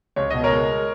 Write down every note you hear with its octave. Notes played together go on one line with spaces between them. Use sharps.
C#2 C#5
B2 D#5
A#4 C#5
G#3